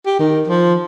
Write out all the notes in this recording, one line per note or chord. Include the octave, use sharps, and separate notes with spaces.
G4
D#3
F3